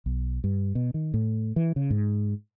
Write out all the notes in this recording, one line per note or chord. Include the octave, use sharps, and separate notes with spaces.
B1
G2
B2
D#3
A2
E3
C#3
G#2